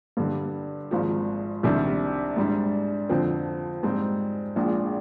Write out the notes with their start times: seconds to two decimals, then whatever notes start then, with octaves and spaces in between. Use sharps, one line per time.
0.17 G2 D3 G3
0.91 G#1 G#2 F3
1.63 C2 C3 D#3 G3 D4
2.36 G#2 G3 D4
3.09 F2 D3 F3 C4
3.83 G#2 G3 C4 D#4
4.56 A#1 A#2 G#3 D4